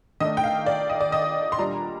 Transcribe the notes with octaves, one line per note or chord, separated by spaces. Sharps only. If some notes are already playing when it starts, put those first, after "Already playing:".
D#3 A3 D4 D#5
G5
F5
D5
D#5
D5
D#5
C6
A#2 G3 D4 A#5